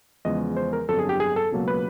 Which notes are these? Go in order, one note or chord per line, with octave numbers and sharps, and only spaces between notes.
E2 C#3 F3 G#3 D#5
C5
A#4
G1 F2 D3 F#3 A4
G#4
G4
G#4
A4
C#2 B2 F#3 A#3
B4